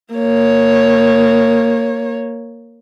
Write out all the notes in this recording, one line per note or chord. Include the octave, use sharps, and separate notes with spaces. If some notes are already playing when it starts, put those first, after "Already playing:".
A#3 C#5